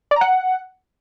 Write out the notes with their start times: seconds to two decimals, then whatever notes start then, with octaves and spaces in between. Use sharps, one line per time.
0.11 D5
0.16 A#5
0.21 F#5